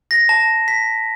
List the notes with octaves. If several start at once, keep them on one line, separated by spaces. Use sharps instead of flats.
A#6
A5
B6